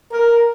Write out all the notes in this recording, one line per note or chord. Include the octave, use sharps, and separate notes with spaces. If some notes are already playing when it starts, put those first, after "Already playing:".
A#4